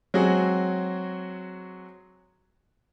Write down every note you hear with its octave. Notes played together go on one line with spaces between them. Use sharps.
F#3 G#3 C4 F#4 G#4